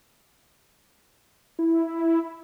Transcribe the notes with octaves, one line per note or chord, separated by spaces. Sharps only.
E4